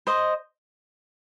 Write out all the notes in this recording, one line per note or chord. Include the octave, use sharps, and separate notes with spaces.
C5 D#5